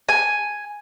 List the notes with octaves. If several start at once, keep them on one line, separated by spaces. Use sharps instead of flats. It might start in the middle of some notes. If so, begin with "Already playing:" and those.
G#5